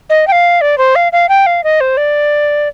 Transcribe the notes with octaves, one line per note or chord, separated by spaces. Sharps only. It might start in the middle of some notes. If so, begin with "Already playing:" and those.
D#5
G5
F5
D5
C5
F5
F5
G5
F5
D#5
C5
D5